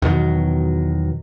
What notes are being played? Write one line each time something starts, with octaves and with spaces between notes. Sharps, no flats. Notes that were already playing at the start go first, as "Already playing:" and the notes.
E2 B2 D#3 F#3